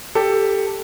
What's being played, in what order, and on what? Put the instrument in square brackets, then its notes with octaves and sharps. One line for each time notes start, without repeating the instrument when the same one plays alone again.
[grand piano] G4 A4